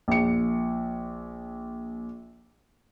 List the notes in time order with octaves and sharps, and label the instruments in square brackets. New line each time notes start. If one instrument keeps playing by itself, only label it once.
[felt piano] A#1 C#7